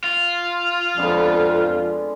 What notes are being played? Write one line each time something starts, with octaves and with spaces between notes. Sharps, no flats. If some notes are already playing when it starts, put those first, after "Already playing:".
F4
F2 D3 G#3 B3